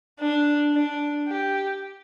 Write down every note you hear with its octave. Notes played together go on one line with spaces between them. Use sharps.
D4
D4
G4